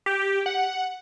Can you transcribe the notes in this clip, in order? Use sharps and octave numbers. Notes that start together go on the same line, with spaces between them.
G4
F#5